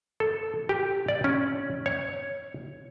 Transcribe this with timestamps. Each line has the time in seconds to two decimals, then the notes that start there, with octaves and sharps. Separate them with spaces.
0.20 A4
0.69 G4
1.08 D5
1.24 C#4
1.86 C#5